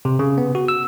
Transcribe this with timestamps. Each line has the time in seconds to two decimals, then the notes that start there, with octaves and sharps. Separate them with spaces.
0.05 C3
0.19 C#3
0.38 B3
0.55 F#4
0.68 E6